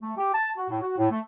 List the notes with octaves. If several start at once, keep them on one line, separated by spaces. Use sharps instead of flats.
A3
G4
A5
F#4
A2
F#4
A2
A3